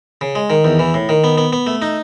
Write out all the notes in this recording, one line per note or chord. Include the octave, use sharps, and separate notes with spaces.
C#3
G#3
D#3
E2
E3
A2
D#3
B3
B3
B3
A3
D#4